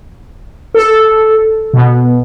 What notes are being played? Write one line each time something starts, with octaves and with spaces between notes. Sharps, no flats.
A4
B2